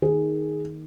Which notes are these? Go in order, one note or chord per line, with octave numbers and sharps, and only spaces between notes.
D#3 G#4